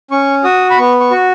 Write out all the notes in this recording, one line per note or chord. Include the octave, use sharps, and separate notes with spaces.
C#4 C#6
F#4 D#6
B5
B3 C#6
C#6
F#4